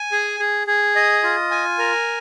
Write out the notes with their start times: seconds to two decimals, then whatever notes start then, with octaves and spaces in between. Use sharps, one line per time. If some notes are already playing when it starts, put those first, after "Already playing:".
Already playing: G#5
0.12 G#4
0.40 G#4
0.67 G#4
0.96 D#5
1.23 F4
1.51 G#5
1.79 A#4